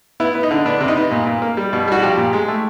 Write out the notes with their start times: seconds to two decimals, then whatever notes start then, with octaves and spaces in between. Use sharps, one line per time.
0.20 B3 E4
0.35 B3
0.43 D#4
0.51 D3
0.66 B3 D4
0.81 C3
0.88 D#4
0.96 B3
1.11 A#2
1.27 A#2
1.42 A#3
1.57 G3
1.73 B2
1.88 G3 F#4
2.03 F3 G4
2.17 A#2
2.33 G#3
2.48 A3